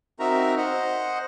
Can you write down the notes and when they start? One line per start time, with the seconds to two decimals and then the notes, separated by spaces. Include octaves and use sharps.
0.19 C4 D#4 F#4 A#4 E5 A#5
0.57 C5 D#5 F#5